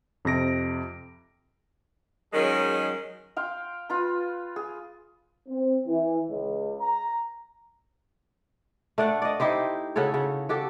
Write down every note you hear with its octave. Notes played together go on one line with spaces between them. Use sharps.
F2 C3 A#6 D7
D#3 F#3 G#3 C#4 G#4
F5 G5 C6
F4 B4 B5
G#4
C4
E3
C#2
A#5
A3 D4 D5 F#5
D5 D#5
D#4 E4 G4 C5
C#3 F#4 A4 C#5
C#3
F#4 G4 A4